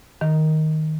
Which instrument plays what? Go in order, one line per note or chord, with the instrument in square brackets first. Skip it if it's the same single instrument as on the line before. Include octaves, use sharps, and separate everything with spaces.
[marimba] D#3